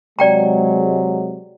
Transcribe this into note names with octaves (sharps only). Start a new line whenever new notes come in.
C3 F#3 G#3 D5 G5 A#5